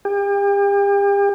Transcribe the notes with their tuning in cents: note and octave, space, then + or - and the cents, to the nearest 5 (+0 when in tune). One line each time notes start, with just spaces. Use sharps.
G4 +40